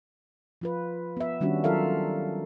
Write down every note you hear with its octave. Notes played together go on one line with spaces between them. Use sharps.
F3 F4 B4
B3 E5
D#3 G3 C#4 D4 F#4
F#3 F4 A4 A#4 E5 F5